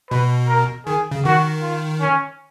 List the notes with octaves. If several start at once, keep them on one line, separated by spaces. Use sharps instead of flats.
B2 B4
A#4
D#3 G#4
C#3
D#3 F#4
F4
C#4